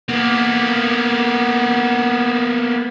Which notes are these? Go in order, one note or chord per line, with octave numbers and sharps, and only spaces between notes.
A#3 B3